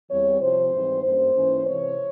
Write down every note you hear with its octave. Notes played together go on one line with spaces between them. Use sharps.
E2 E3 G3 C4 C#5
C3 F3 C4 C5
G#2 E3 G3 C4
G2 G3 A#3 C#4 C5
G#2 E3 A#3 C#4
C3 E3 G#3 C4 C#5